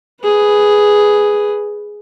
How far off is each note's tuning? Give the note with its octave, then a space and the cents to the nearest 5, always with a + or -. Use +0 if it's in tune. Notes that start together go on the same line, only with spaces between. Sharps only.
G#4 +0 B4 +0